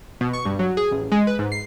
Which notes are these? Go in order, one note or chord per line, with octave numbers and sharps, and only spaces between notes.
B2
C#6
G2
F#3
G#4
A1
G#3
B4
G#2
C7